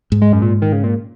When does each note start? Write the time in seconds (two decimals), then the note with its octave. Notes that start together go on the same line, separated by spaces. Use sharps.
0.12 G#2
0.22 G#3
0.33 F#2
0.42 A#2
0.62 D#3
0.72 C#3
0.84 A#2